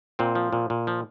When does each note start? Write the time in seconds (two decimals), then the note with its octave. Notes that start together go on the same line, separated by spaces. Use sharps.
0.19 A#2 C4
0.35 F3
0.53 A#2
0.70 A#2
0.87 F3